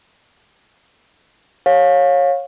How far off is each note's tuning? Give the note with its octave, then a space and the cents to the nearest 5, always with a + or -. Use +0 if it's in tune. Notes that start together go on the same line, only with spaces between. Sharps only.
C#5 -15 F5 +20